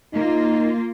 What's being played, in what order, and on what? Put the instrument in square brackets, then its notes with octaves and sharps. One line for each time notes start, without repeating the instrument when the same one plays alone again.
[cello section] A#3 F4 [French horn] D#4